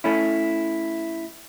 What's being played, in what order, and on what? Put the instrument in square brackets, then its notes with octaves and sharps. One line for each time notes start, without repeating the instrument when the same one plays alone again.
[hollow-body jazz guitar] A3 C#4 E4